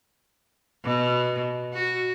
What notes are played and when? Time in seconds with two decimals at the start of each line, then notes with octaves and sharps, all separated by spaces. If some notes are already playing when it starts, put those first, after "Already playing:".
0.84 B2
1.74 F#4